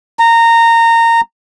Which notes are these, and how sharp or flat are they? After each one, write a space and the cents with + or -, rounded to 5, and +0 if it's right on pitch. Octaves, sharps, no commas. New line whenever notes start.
A#5 -20